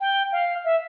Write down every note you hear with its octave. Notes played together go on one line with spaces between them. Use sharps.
G5
F5
E5